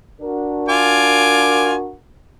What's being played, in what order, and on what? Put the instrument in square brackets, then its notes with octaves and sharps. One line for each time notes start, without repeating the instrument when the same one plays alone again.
[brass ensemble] D4 F#4 A#4
[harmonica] F4 G#5 D6